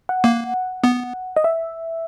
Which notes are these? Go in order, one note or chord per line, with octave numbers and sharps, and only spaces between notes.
F#5
A#3
B3
D#5
E5